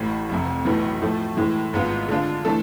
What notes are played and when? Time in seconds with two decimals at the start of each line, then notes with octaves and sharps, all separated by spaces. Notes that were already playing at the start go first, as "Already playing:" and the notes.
Already playing: A1 A2 E3
0.29 F1 F2 C3
0.65 B1 A2 E3 B3
1.02 A2 F3 A3
1.37 A2 E3 G#3
1.73 G#1 G#2 G#3 B3 F4
2.09 D3 G#3 D4 F4
2.45 E3 A3 D4 A4